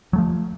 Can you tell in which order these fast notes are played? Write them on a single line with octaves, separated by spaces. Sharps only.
F#3 A3 F3